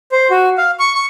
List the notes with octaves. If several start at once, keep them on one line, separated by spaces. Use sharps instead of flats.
C5
F#4
F5
C#6
C#6